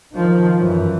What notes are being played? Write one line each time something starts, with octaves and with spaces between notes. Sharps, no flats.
D#3 F3
F#2 E3